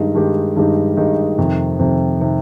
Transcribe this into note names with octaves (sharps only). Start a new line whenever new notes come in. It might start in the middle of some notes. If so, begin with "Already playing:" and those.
Already playing: G2 D#3 G#3 D#4 G4
G2 D#3 G#3 D#4 G4
G2 D#3 G#3 D#4 G4
G2 D#3 G#3 D#4 G4
F2 C3 D#3
F2 C3 D#3
C3 D#3